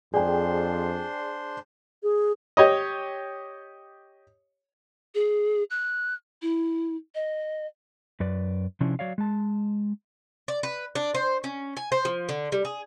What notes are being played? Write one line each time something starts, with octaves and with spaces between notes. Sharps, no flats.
F2 D4 G#4 C5 D5 G5 C6
G#4
G4 C#5 D#5
G#4
F#6
E4
D#5
F#2 B4 D5
C3 F3 C#4 D4 E4
F#3 C#5 D5 F5
G#3 A5
D5
B4
D4
C5
C#4
G#5
C5
F3
D3
G3
G#4